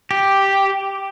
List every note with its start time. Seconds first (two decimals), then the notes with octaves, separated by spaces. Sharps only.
0.11 G4